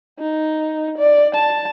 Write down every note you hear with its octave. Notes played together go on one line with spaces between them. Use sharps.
D#4
D5
A5